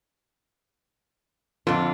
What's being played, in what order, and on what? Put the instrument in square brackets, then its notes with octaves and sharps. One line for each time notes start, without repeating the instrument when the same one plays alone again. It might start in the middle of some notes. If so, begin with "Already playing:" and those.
[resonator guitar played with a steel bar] F2 D3 [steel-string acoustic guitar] F4